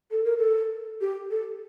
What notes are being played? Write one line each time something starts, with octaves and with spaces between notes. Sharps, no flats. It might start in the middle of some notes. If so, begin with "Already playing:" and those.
A4
A#4
A4
G4
A4